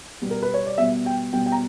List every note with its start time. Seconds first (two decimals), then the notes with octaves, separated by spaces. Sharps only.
0.22 B2 G3 B3
0.30 A#4
0.42 B4
0.54 C#5
0.66 D5
0.78 B2 G3 B3 E5
1.06 G5
1.33 B2 G3 B3 G5
1.46 G5
1.52 A#5